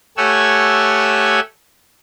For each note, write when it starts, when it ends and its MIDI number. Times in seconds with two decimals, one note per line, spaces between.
0.17 1.40 57
0.17 1.40 67
0.17 1.40 73
0.17 1.40 78
0.17 1.40 80
0.17 1.40 88